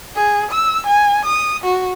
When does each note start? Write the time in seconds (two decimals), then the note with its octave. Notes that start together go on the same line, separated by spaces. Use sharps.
0.15 G#4
0.51 E6
0.86 G#5
1.25 D#6
1.64 F#4